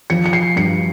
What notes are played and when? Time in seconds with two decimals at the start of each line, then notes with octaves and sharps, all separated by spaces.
0.10 F3 C#7
0.26 C#7
0.33 C7
0.56 G2 C#7